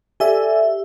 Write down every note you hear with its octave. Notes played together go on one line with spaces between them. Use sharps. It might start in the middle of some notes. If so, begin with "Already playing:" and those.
G4 A4 D5 E5 G#5